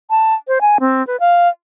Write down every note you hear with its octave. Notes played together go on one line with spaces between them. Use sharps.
A5
C5
G#5
C4
B4
F5